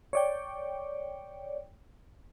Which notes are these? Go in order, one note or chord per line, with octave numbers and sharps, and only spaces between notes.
C#5 D5 G5